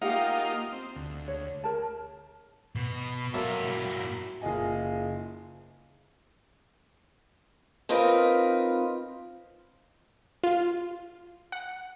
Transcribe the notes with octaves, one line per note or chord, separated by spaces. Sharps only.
A#3 D#4 F4 G4 F5 F#5
C4
D2
C#5
A#4 A5
B2
B2 F#3 A#3 A4 E5
A#2 E4
F#1 F4 G#4 D#5 G#5
C4 D#4 F4 A#4 B4
F4
F#5